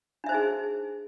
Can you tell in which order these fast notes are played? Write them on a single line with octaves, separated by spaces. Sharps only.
D4 E5 C5 D#4 G#4